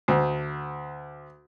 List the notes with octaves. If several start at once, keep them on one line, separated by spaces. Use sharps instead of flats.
D2